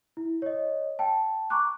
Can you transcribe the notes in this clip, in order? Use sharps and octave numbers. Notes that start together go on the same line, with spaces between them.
E4
C#5 D#5
G5 A5
A#5 C#6 D6 F#6